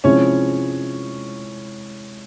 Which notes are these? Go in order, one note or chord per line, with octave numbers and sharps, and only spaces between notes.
C3 F3 G#3 C4 C#4 E4 C#5